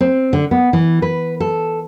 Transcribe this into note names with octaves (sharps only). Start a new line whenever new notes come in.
C4
D3
B3
E3
B4
A4